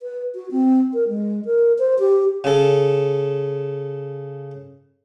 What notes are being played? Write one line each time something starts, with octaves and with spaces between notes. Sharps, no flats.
B4
F#4
C4
A#4
G#3
A#4
C5
G4
C#3 A4